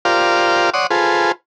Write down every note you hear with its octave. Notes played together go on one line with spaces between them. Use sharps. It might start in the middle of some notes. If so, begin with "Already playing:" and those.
F4 G4 A#4 C5 D5 F5
C#5 D5 F#5 C6 D#6
F4 G#4 A4 B4 C5